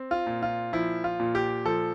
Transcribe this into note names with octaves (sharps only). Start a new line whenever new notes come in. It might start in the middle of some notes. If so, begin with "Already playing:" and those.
Already playing: C4
F4
A#2
F4
F3 E4
F4
A#2
G4
F3 A4